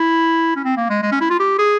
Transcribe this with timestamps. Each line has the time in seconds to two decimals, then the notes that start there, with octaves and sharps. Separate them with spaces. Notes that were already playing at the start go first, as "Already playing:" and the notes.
Already playing: E4
0.56 C#4
0.65 C4
0.77 A#3
0.90 G#3
1.02 G#3
1.12 C#4
1.21 E4
1.30 F4
1.40 G4
1.59 G#4